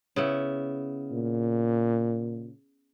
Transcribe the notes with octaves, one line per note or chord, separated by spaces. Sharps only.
C#3 B3 E4
A#2